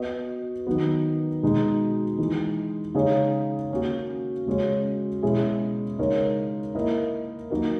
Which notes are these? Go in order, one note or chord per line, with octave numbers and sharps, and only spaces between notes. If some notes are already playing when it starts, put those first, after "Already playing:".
Already playing: B3 F#4 B4 D#5
D#3 F#3 B3
B2 G#3 D#4 F#4
E3 G#3 D#4
C#3 G#3 D#4 G#4 C#5
A#3 C#4 F#4
C#3 G#3 C#4 F#4 C#5
B2 G#3 C#4 E4 G#4
C#3 G#3 D#4 A#4 C#5
A#3 E4 A#4 D#5
F#3 A#3 D#4 F#4 A#4